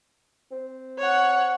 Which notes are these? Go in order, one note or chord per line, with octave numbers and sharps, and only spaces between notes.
C4
C#5 F#5